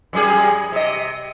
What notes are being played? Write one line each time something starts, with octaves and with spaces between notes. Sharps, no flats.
F#2 G3 G#4
C3 D#5